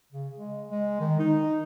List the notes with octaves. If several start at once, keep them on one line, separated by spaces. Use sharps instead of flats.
C#3
G#3
G#3
D#3
D#4